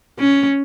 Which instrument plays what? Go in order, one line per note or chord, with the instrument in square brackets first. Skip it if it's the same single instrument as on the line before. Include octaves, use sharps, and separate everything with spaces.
[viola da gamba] C#4